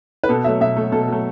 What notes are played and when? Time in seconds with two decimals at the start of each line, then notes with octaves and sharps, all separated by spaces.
0.24 B4
0.29 B2 A4
0.44 F#3 A3 E5
0.61 B2 E5
0.77 F#3 A3
0.92 B2 A4
1.08 F#3 A3